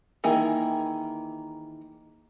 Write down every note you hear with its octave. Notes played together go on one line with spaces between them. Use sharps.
D#3 E3 A#3 G#4